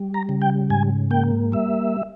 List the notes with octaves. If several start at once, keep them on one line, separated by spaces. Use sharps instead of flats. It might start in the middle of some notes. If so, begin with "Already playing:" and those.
Already playing: G3
A#5
C#3
G5
G#2 G#5
A#3 G5
G3 E5